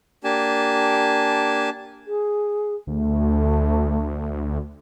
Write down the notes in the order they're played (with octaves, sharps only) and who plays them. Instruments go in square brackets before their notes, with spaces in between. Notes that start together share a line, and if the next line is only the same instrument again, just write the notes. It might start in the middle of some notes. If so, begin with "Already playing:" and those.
[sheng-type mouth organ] A#3 D4 G4 G#5 A5
[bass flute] G#4
[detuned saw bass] D2 [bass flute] A3